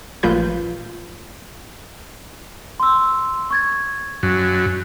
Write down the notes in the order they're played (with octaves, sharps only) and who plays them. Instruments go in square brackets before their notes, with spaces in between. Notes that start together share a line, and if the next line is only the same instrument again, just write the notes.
[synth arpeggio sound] A1 A#2 F3 F4 B4 G6
[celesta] C6 E6
C#6 G#6 A6
[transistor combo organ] F#2